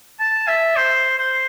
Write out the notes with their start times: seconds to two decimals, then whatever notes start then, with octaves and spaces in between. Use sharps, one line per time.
0.19 A5
0.48 E5
0.76 C5
1.18 C5